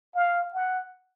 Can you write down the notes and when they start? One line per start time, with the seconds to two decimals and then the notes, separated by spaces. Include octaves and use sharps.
0.16 F5
0.54 F#5